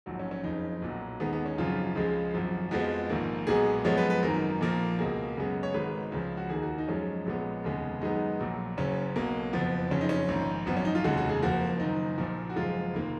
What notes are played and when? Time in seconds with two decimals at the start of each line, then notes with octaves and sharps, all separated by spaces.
0.06 A#1 G#2 F#3
0.19 C#4
0.31 C#4
0.44 F#1 F2 C#3 D#4
0.82 B1 A#2 F#3
1.20 D#2 D#3 G#3 B3
1.33 B3
1.46 C#4
1.58 G#1 F#2 C#3 F3 F4
1.95 C#2 C#3 F3 G#3
2.34 G#1 F#2 F3
2.71 F2 F3 G#3 B3 F#4
3.09 A#1 G#2 D#3 A#3
3.47 B1 A#2 G#3 B3 G#4
3.84 F#2 F3 G#3 B3 C#5
3.97 B4
4.10 B4
4.22 G#1 F#2 D#3 A#4
4.61 A#1 A#2 F3 A#3
4.98 C#2 B2 A#3 G#4
5.37 F#2 C#3 G#3 B3
5.63 C#5
5.74 G#1 G#2 D#3 G#3 B4
6.12 C#2 C#3 F3
6.37 F#4
6.49 D#2 D#3 A#3 G#4
6.62 F#4
6.78 D#4
6.88 F#2 F3 G#3 C#4
7.26 A#1 A#2 G#3 B3
7.64 F1 D#2 C#3 G#3 B3
8.01 F#2 D#3 G#3 B3 D#4
8.39 A#1 A#2 F#3
8.77 F#1 F#2 C#3 C#4
9.16 B1 B2 A#3
9.53 F#1 F2 F3 B3
9.90 F#1 F2 C#3 C#4
10.01 D#4
10.09 C#4
10.28 A#1 G#2 D#3
10.66 G#1 F#2 F3 B3
10.77 C#4
10.85 D#4
10.95 F4
11.04 F1 D#2 C#3 G#3 F#4
11.17 F#4
11.29 G#4
11.42 F#1 F2 F3 A#3 F#4
11.80 F#1 F#2 D#3 D#4
12.18 A#1 A#2 F3
12.50 F#4
12.56 F#1 F#2 F3 G#3 F4
12.94 F1 D#3 A#3